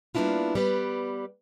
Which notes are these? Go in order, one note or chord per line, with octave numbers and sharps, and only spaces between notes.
G3 A#3 B3 D4 E4 F4
G3 B3 B4 D5